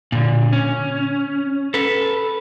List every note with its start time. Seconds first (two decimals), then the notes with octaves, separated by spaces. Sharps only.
0.12 A#2 D3
0.53 C#4
1.74 A4 B4